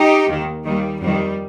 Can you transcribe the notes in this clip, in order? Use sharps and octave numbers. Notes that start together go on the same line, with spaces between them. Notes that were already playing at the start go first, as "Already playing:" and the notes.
Already playing: D#4 G4
D#2 D#3
D#2 D#3 G3
F2 D#3 G3